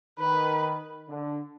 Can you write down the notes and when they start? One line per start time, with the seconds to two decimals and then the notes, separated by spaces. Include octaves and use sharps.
0.19 D#3 B4
1.08 D3